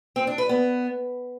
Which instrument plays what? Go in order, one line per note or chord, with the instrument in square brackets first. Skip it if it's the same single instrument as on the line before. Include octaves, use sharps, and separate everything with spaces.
[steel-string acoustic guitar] C4
D4
B4
B3